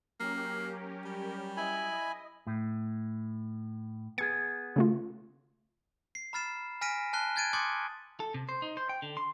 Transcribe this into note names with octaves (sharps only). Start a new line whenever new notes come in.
F#3 A#3 C#4 G4 A#4
G3
E4 D#5 G#5 B5
A2
B3 G#4 G#6 A6 C#7
C#3 A3 F4
C7
A#5 B5 F6 A6 C7 E7
G#5 F6 A#6 B6 D7 D#7
A5 F6 F#6 C7 G7
F#6 G#6 A6 D7 D#7
C6 D6 D#6 G6 A6 C#7
A4
C3
C5
D#4
C5
G5
D3
C6